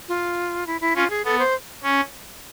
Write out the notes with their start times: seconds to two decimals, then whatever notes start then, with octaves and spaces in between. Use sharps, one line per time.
0.08 F4
0.67 E4
0.81 E4
0.95 C#4 F4
1.10 G#4
1.25 B3 A4
1.39 C5
1.83 C#4